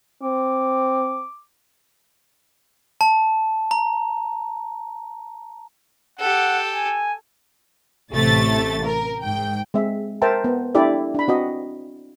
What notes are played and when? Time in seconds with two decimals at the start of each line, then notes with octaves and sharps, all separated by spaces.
0.22 C4 D6
3.01 A5
3.71 A#5
6.19 G4 A4 F#5
6.74 G#5
8.13 A1 C3 A3 A6
8.85 A#4
9.24 G#2 G5
9.74 G#3 C4 E5
10.22 A#4 C5 E5 G5 A5 A#5
10.44 B3
10.75 D4 E4 G4 A4 D5 E5
11.14 D4 B5
11.28 C4 F#4 D#5